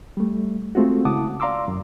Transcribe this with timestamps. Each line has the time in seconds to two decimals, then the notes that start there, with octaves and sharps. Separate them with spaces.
0.17 G3 A3
0.75 G#3 A3 C4 F4 F#4
1.05 C#3 E4 F#5 A5 D6 D#6
1.40 D5 F5 A#5 C6 D6 E6
1.68 F#2